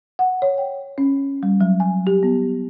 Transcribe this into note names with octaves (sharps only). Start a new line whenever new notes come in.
F#5
C#5
G5
C#4
G3
F#3
G#5
G4
B3